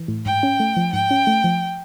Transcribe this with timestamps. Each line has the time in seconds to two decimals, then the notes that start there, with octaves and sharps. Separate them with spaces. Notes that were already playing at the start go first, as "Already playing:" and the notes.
Already playing: E3
0.08 A2
0.26 G#2 G5
0.43 C#4
0.60 A3
0.77 F3
0.93 G#2 G5
1.11 C#4
1.27 A3
1.44 F3